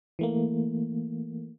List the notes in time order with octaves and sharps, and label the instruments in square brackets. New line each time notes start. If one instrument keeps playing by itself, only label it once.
[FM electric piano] E3 A3 A#3